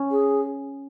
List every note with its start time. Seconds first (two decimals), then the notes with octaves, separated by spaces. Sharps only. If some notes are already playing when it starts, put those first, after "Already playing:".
Already playing: C#4
0.11 G#4